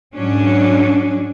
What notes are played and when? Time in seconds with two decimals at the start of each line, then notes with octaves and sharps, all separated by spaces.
0.15 G#2 F#3 C#4 D4